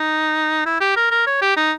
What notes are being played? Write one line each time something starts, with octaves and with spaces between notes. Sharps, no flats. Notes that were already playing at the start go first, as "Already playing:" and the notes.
Already playing: D#4
E4
G4
A#4
A#4
C#5
G4
D#4